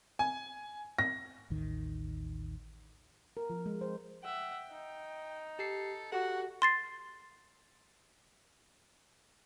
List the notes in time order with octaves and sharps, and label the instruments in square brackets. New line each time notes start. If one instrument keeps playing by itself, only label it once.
[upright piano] G#5
A#6
[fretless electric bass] A1 D#2 D#3
[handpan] A#4
F3
G#3
C5
[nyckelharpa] E5 F#5 [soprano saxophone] G5
[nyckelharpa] D#4
[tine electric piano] G4 C7 [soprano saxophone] A4
[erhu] F#4 [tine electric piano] G4 A4 [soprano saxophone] F#5
[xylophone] C6 A6 C7